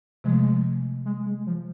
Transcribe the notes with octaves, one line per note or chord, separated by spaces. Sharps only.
C3 F3 G#3 A3
G#3
G#3
F3